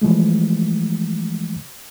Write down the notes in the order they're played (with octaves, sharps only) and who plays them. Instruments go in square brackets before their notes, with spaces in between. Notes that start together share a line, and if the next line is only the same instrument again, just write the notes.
[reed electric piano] E3 F3 G#3 A3